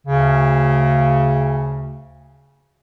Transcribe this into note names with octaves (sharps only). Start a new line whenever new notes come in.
D2 C#3